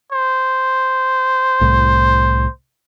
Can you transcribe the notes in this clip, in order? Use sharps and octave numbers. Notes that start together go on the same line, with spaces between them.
C5
C2 A2